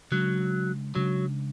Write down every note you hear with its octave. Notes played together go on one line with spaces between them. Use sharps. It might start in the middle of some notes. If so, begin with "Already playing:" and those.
C#3 F#3 G#3 D4
C#3 F#3 G#3 D4